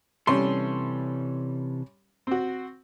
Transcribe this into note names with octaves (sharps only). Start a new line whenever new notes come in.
C3 E3 G3 C#4 A4 C6
C4 F#4